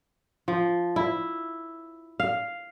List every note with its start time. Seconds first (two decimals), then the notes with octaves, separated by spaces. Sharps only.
0.48 F3
0.96 E4
2.20 F5